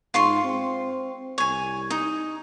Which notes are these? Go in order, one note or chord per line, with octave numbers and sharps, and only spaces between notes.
G#2 F4 C6 C#6
C4
C2 C#5 G#5
D#4